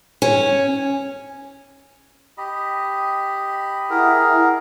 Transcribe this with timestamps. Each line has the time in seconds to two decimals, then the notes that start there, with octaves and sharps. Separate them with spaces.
0.22 C#4
2.38 G4 D#5 B5
3.90 E4 G#4 A#4 F#5